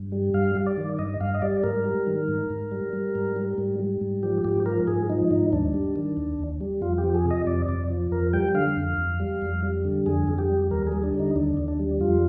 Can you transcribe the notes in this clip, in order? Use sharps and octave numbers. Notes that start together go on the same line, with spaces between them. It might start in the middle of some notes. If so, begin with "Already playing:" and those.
Already playing: G2
G3
G2 F5
G3
D5
D#3
G2 D#5
G2 F5
D#5
G3 D5
G#2 A#4
G3
D#3
G#2
G#2
G3
G3
G#2
G3
G#2
G3
G#2
F3 G4
G#2 G4
F3 A#4
G#2 G#4
F3 D#4
G#2 D#4
D#2 D4
G3
D#3
D#2
D#2
G3
F2 F4
G4
F3
G#4
C3
D#5
F2 D5
F2 D5
F3
F2 A#4
G3 G5
D3 F5
F2
F2
G3
F2
G3
D3
F2 G#4
F2
G4
G3
D#2 A#4
G#4
G3
D4
D3
D#4
D#2 D4
D#2
D4
G3
F2 F4